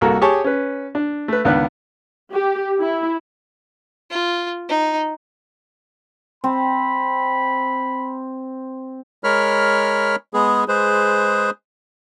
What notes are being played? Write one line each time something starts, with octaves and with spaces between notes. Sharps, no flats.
C2 A#3 F#4 A4
G4 G#4 C#5 G#5 A5 C#6
C#4 B4
D4
A3 B4
C#2 D#3 B3 D4 F#6
G4
E4
F4
D#4
C4 B5
G#3 A#4 C#5 B5 F6
G#3 B3 G#4
G#3 G#4 B4 C5